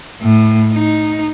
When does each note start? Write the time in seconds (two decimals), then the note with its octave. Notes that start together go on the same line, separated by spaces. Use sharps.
0.22 A2
0.74 D#4